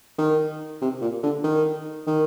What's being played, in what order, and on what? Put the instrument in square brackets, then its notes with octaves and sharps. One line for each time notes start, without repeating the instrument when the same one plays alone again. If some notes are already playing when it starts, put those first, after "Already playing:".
[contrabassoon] D#3
C3
A#2
D3
D#3
D#3